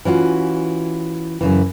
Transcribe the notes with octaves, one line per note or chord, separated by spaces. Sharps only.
E3 C#4 F4 F#4
F#2 C#3 E3